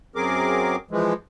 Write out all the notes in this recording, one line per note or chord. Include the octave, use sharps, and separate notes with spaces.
F#2 F#3 C4 G#4 A#4 D6
E3 F3 G#3